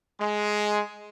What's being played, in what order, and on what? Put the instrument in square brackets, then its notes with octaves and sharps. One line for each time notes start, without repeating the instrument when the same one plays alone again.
[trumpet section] G#3